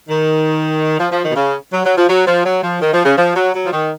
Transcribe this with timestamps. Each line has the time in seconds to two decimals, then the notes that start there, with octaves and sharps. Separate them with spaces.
0.08 D#3
0.99 F3
1.11 F3
1.23 D#3
1.30 B2
1.35 C#3
1.72 F#3
1.84 F#3
1.96 F3
2.08 F#3
2.26 F3
2.44 F#3
2.62 F3
2.81 D#3
2.92 F3
3.04 C#3
3.17 F3
3.35 F#3
3.53 F#3
3.65 F3
3.72 D#3